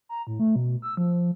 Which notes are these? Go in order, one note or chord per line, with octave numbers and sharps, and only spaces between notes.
A#5
A2
A3
B2
E6
F3